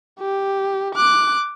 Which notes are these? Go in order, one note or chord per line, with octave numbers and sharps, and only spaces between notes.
G4
D6 F#6